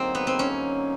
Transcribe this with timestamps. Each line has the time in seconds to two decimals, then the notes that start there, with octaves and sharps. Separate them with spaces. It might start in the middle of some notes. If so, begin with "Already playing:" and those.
Already playing: D3 F#3 A#3 C4 D#4
0.15 B3
0.27 C4
0.39 C#4